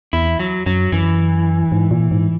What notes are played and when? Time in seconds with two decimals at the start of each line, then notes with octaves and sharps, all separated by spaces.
0.13 E2 E4
0.39 F#3
0.66 F#2 F#3
0.92 F#2 E3
1.72 G#2
1.91 A#2
2.11 G#2